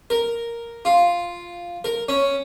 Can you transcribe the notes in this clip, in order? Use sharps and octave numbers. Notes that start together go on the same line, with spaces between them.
A#4
F4
A#4
C#4